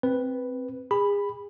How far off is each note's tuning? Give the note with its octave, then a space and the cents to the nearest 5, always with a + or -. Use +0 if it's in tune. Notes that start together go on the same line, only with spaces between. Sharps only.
C4 +0 B4 +0
G#4 -35 B5 +0